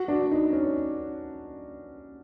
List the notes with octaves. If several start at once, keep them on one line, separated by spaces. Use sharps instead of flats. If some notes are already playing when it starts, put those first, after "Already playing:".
Already playing: F#4
D4
D#4
C#4